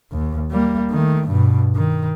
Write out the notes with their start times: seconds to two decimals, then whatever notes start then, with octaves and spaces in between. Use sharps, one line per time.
0.12 D#2
0.51 G3 A#3
0.91 D#3 A3
1.28 G2 B2
1.76 D#3